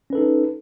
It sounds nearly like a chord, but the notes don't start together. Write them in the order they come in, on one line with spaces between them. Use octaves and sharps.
C#4 B4 A4 D#4